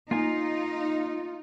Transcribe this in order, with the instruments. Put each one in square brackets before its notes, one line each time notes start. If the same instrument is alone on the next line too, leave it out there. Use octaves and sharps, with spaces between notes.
[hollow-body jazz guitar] A#3 G#5 [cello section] D#4 [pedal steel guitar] F4